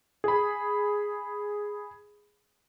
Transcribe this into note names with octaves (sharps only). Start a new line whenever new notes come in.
G#4 B5